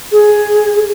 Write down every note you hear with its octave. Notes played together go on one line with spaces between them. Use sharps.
G#4